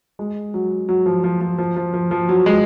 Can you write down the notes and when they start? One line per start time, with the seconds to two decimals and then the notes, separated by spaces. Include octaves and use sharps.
0.19 G#3
0.54 F#3
0.89 F#3
1.06 F3
1.24 F3
1.41 F3
1.58 F3
1.76 F3
1.94 F3
2.11 F3
2.29 F#3
2.46 G#3